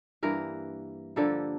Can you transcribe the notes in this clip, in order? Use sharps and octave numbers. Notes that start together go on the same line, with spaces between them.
G2 E3 A#3 A#4
G2 D3 F3 A#3 A4